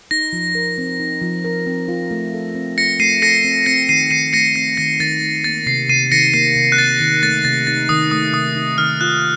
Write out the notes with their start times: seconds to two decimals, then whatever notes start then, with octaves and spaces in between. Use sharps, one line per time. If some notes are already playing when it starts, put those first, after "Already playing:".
0.11 D#4 A#6
0.33 F3
0.55 A#4
0.78 C4
1.00 D#4
1.22 F3
1.45 A#4
1.67 C4
1.88 F4
2.11 A3
2.34 A4
2.55 C4
2.78 F4 A#6 C#7
3.00 A3 C7 D#7
3.22 A4 A#6 C#7
3.44 C4
3.66 C4 A#6 C#7
3.89 D#3 C7 D#7
4.11 D#3 C7 D#7
4.33 A3 A#6 C#7
4.56 C4 C7
4.77 D#3 A#6
5.00 D#3 A6
5.22 A3
5.44 A#3 A6
5.67 C3 C7
5.89 C3 C7 D#7
6.12 D#3 A#6 C#7
6.34 A#3 C7
6.56 C3
6.72 F#6
6.78 C3 A6
7.00 D#3
7.23 A3 A6
7.45 C3 A6
7.67 D#4 A6
7.89 D#3 D#6
8.11 A3 D#6
8.34 C3 D#6
8.56 D#4
8.78 D#3 F6
9.01 F4 F#6